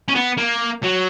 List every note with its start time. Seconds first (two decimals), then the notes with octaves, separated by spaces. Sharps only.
0.08 C#4
0.15 B3
0.38 A#3
0.83 F#3